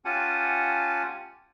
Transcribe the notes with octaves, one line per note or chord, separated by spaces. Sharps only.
C#4 F4 G4 F#5 G#5 A5